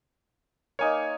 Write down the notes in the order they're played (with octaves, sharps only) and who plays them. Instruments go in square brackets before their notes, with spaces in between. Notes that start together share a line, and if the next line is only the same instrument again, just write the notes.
[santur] A#3 D#4 [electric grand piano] C#5 G#5